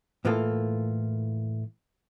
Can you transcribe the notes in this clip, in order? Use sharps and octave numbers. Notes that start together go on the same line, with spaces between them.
A2 E3 A#3 F4 A4